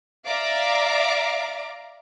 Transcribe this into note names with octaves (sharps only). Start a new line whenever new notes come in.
D5 E5 F5 A#5 D6